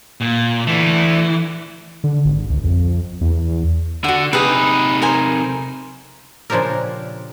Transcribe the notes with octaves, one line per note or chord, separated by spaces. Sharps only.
A#2
D3 E3 A3
D3
G#1
C#2
F2
E2
D3 F#4 F#5
C3 D#4 G#4 B4
A#4 C5 G#5
A#2 C#3 F3 D4 G4 A#4